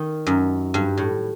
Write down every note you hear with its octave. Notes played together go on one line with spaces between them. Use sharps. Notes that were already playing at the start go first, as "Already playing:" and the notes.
Already playing: D#3
F#2
G2
A2